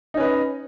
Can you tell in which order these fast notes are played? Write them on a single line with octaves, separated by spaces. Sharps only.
D#4 C#4 B4 D#5